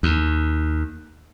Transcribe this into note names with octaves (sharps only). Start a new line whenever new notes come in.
D#2